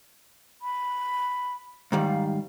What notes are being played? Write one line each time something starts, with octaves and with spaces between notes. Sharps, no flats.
B5
G#2 D#3 G3 F5